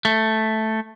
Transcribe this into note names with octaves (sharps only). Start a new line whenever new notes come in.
A3